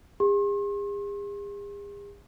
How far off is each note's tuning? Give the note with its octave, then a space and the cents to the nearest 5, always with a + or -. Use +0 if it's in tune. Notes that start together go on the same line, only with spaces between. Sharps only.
G#4 -45 C6 +45